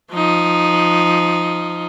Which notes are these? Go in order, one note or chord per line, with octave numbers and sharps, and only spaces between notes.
F3 D#4